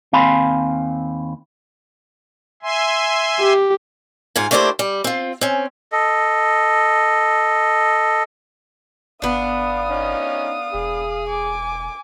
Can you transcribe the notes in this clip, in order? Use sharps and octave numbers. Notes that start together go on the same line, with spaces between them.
D#2 C4 F5 G#5 B5 C6
E5 G#5 C6
G4
G#2 F4 G#5
A3 A#3 D4 E4 G4 C5
G3
C4 F4
C4 C#4
A4 D#5
G1 B3 D4 F5 D#6
C#4 D#4
E1 G#4
G#5 D6